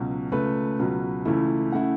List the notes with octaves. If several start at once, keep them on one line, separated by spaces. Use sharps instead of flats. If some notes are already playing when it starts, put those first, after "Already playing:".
Already playing: C#2 B2 F#3
C#2 C#3 A3 B4
C#2 B2 F#3
C#2 C#3 E3 A3 E4
C#3 A3 E4 F#5